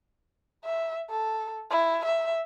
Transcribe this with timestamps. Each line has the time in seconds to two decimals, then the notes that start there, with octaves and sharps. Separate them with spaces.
0.65 E5
1.10 A4
1.70 E4
2.05 E5